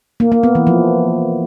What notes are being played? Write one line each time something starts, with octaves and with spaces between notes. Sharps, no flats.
A#3
A#3
B3
E3
F3